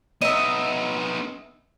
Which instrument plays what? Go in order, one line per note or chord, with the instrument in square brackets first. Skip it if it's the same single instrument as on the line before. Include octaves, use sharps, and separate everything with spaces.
[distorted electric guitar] B3 D#4 [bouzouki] D#5 E5